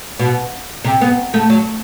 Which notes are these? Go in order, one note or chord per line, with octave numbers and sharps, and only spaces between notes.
B2
C3
B3
A3
F#3